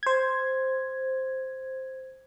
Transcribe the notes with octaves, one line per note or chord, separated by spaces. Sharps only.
C5 G#6